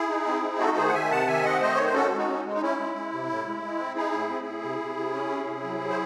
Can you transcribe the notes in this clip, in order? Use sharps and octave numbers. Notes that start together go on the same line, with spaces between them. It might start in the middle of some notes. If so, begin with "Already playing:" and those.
Already playing: E4 G#4
D#4
C4
D#4
A3 F#4 A4
D#3 G#4 C5
F#5
D#3 E5 G#5
C3 F#5 A5
D#3 E5 G#5
C4 D#5 F#5
A3 C5 D#5
D#3 C#5
C5
C#4 F#4 A4
G#3
D#4 F#4
C#4
G#3
D#4
C#4 E4
G#3
G#3
C3
A2
G#3
G#3
C4
D#4 E4 G#4
A2
C4
A2
C3
C3
C3
C#4
C3
C3
F#3
F#3
C5